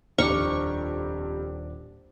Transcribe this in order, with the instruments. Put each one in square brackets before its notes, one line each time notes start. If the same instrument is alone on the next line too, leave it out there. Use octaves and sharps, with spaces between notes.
[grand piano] D#1 D4 D6 [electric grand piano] F2 G4 A#5 [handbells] C5 [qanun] C#6